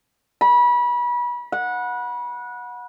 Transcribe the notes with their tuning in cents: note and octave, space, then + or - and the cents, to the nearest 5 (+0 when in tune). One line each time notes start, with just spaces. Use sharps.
B5 -30
F#5 -20